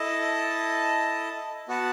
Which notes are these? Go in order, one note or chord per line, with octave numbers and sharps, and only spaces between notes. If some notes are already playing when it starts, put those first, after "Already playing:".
Already playing: E4 A4 D#5 A5
B3 F#4 B4 F#5 A5